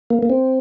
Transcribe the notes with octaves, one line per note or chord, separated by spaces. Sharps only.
A#3
A#3
C4